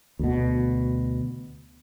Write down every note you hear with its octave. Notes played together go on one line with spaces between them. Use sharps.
D2 B2